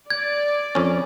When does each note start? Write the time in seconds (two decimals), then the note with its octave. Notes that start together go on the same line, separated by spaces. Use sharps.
0.10 D5 G#6
0.75 F2 C#4